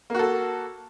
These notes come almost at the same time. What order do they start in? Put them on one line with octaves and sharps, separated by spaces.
A#3 F#4 A4